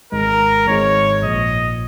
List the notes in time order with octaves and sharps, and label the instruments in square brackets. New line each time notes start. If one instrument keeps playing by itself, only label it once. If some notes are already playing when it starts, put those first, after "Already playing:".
[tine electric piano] G#1 G#2 G#3 [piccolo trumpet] A#4
[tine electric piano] G#1 G#2 G#3 [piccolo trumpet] C#5
[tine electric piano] A#1 A#2 F3 [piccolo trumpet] D#5